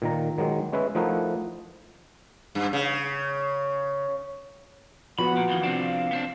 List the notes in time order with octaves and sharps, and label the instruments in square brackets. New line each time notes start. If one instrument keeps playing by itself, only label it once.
[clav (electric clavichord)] A#2 D#3 A#5
D#3 F#3 G#3
G#3 C#4 B4 E5
F3 A3 D#4 E4 A#4 F#5
[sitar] G2
C#3
[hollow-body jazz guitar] F3 B3 F#4 [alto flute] F#5 [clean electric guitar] B5
[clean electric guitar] A#2
F2 D#3 E3
C3 C4 D4
[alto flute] F5
[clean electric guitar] B3 C4 D4